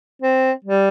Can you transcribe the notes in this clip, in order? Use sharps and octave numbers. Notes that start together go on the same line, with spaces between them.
C4
G3